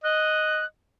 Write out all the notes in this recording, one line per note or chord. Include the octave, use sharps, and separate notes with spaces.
D#5 F#6